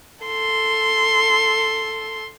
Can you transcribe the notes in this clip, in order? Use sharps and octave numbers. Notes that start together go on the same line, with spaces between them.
A4 C6